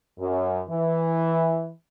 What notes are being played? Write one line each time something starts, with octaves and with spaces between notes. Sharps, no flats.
F#2
E3